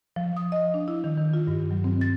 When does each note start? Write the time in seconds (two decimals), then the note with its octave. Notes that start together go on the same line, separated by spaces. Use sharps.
0.16 F3
0.37 D#6
0.52 D#5
0.74 D4
0.88 E4
1.04 D#3
1.17 D#3
1.33 F4
1.47 G2
1.71 F#3
1.84 C4
2.01 A6